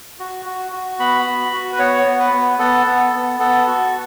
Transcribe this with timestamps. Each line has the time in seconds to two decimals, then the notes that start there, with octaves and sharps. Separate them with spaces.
0.19 F#4
0.45 F#4
0.72 F#4
0.99 B3 B5
1.26 F#4
1.52 F#4
1.72 B4
1.79 B3 C#5
2.06 B3
2.20 B4
2.33 B3
2.59 B3 A4
2.86 B3
3.13 B3
3.39 B3 A4
3.67 F#4